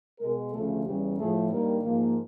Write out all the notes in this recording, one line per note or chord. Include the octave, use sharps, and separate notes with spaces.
B2 G#3 A#4
D2 C#3 F3 A3 A4
E2 C#3 E3 G3 G4
A2 F3 A3 G#4
G2 D#3 G3 A#3 A#4
G#2 F3 A#3